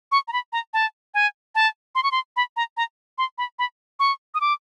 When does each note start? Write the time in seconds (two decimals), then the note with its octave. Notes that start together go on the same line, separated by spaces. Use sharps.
0.12 C#6
0.28 A#5
0.33 B5
0.53 A#5
0.73 A5
1.14 G#5
1.55 A5
1.95 C6
2.03 C#6
2.12 C6
2.36 B5
2.57 A#5
2.77 A#5
3.18 C6
3.38 B5
3.59 B5
4.00 C#6
4.34 D#6
4.41 D6